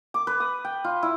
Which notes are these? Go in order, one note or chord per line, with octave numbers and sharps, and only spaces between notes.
D6
B4
D#6
G5
F4
E4